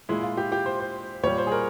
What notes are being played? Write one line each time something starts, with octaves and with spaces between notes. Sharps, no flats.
A#2 G#3 E4
F4
G4
G4
C5
C5
A#2 G3 C#5
C5
G#4
A#4